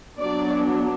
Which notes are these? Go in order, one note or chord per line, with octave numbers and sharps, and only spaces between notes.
F#3 B3 D4 D5